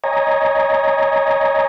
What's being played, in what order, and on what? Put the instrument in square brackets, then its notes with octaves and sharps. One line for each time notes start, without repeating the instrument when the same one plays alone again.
[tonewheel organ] C#5 D#5 G#5 A#5